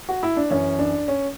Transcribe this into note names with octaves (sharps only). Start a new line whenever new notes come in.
F#4
E4
D4
F#2 E3 C#4
D4
C#4